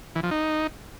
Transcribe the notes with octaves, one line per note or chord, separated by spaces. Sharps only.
E3
F3
D#4